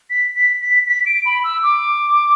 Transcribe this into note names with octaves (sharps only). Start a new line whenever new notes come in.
B6
B6
B6
B6
D7
B5
E6
D6